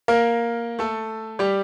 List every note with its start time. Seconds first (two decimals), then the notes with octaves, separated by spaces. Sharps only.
0.08 A#3 A#4
0.79 A3 A4
1.39 G3 G4